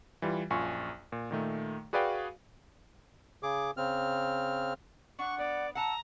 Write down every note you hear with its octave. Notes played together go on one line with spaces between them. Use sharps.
E3 G3 F4
A#1 F#2 F4 G#5 C#6
A#2
A#2 D#3 A3
F#4 G#4 B4 D5 F5 G5
C#3 G#4 D6
C#3 C4 F6
D4 F#5 C#6
B3 D5
F#5 A5 A#5 E6